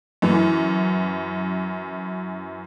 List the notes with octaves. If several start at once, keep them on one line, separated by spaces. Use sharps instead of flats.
F#2 E3